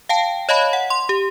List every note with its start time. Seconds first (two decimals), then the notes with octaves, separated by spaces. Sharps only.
0.09 F5 G5 A5
0.49 C#5 D#5 F5 A5 B5
0.73 F#5
0.90 C6
1.09 G4